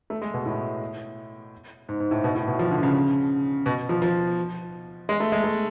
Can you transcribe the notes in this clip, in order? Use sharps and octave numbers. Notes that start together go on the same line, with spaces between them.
A3
G#3
B2
A2
G#2
G#2
A2
B2
A2
B2
F3
D3
C#3
B2
F3
F3
G#3
A3
G#3
A3